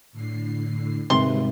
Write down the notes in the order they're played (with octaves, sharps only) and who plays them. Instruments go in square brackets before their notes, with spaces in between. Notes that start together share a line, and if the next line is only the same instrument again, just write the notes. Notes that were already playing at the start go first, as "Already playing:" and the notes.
[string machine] A2 D3 C7
[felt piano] G#1 C3 [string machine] G3 G#3 B4 [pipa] C6